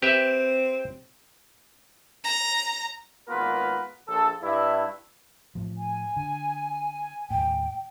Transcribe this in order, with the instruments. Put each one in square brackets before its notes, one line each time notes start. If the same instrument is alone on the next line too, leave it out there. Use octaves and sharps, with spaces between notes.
[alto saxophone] C4 [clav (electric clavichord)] G4 B4 E5
[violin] A#5
[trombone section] G#1 A#3 B3 F4 A#4 B4
A#1 A4
G2 E4
[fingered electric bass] A2 F3
[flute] G#5
[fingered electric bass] D3
[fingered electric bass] D#2 A2 [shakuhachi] G5